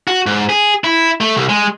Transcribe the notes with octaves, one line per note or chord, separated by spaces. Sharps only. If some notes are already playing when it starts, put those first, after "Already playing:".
F#4
G#2
G#4
E4
A3
C2
G#3